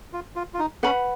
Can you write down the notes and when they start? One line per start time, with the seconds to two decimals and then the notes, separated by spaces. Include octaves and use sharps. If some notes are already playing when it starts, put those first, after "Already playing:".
0.13 F4
0.36 F4
0.54 F4
0.59 D#4
0.83 C#4 B4 F#5 B5